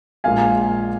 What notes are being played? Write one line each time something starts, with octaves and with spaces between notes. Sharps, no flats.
A#1 A#2 G#3 F5 G#5